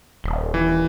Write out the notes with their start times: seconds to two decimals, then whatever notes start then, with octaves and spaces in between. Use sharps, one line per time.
0.24 D#1
0.54 E3